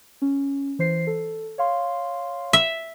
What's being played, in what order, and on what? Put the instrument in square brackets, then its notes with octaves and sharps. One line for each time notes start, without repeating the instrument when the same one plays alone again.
[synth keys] C#4
E3 C5 C7
A4
C#5 F5 C6
[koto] E5